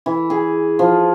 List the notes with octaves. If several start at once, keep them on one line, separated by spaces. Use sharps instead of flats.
E3
G#4
F3